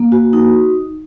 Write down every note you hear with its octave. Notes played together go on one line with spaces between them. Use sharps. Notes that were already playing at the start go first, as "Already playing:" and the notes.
Already playing: A#3
F#4
D#4